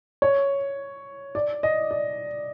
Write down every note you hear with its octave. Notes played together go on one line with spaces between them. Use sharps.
C#5
D5
D#5
D5